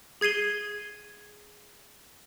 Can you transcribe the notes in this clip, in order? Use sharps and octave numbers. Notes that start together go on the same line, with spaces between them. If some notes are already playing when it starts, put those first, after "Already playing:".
G#4 G#6 C7 D#7 G7